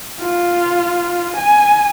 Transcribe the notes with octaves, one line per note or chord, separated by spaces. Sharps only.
F4
G#5